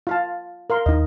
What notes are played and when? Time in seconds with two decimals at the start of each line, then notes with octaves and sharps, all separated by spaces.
0.07 F4 F5 A5
0.70 A#4 F5 C6
0.86 D#2 D#4 D#5